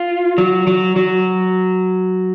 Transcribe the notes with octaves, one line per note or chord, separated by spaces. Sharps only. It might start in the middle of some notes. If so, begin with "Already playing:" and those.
Already playing: F4
F#3
F#3
F#3